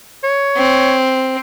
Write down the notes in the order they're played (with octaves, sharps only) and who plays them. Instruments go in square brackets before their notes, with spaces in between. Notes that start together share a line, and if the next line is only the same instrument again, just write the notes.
[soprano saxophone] C#5
[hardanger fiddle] C4